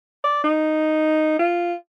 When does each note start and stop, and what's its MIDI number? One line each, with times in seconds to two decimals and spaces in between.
0.24 0.43 74
0.44 1.35 63
1.39 1.73 65